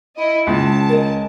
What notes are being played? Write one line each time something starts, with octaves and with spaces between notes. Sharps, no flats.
E4 D#5
C#2 A5
G#3 C#4 A#4